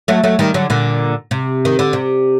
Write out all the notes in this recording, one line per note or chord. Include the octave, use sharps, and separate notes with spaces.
F#3 A3
F#3 A3
D#3 G3
D3 F#3
A#2 D3
C3
D#3
D3
C3